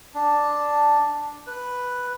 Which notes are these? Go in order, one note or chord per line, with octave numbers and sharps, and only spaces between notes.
D4
B4